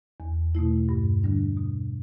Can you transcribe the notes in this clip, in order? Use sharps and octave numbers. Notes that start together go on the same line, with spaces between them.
E2
B2 A3 E4
G2
D3 G3 D4
B2